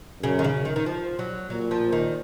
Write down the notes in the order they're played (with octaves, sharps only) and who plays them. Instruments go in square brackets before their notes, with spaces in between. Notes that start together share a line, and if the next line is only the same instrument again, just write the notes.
[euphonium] F#2 [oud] C#3
[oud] D#3
C#3
D#3
D#3
F3
F#3
[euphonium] A#2 [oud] F#3
[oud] F3
D#3